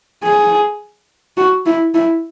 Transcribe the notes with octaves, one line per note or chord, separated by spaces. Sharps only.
G#4
F#4
E4
E4